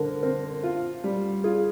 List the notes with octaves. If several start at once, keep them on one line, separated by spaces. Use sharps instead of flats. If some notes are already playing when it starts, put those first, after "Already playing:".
Already playing: D3 A#4 C5
C4 A#4
F4
G3
F4 G#4